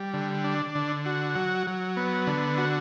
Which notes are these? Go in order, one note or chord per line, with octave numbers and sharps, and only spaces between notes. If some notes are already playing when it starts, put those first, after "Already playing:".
Already playing: G3
D3
D4
D3
F#4
F#3
F#3
B3
D3
F#4